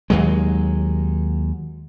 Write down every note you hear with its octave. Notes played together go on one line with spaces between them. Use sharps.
D#2 F#3 G#3